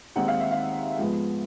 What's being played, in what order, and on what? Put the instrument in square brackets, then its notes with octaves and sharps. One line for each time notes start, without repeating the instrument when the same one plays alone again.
[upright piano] D#2 D#3 G#3 C4 D#4 F#5
F5
E5
F5
G#2 F3 G#3 B3